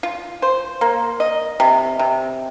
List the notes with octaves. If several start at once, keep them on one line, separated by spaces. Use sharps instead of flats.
F4
C5
A#3
D#5
C3
C3